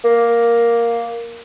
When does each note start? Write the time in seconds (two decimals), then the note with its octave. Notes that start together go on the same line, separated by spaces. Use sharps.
0.05 A#3